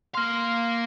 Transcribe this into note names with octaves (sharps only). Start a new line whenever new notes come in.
A#3 F5 C6 F6